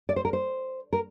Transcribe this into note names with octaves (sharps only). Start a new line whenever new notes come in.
D5
C5
A#4
C5
A#4